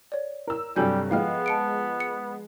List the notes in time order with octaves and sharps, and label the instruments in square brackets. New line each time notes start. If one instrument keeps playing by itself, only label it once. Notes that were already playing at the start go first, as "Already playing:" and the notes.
[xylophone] C#5 D5
[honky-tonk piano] A#4 E6
[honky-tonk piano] G2 C3 F#3 [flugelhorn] G3 [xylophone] A4 G#5 G6
[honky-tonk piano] F3 G#3 [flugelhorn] B3 [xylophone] F5 G5 F6
[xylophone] A5 C#7 D7
C#7